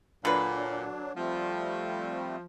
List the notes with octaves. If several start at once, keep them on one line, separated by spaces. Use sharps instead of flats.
A#2 D3 F#3 D4 B4
F3 G3 A3 C4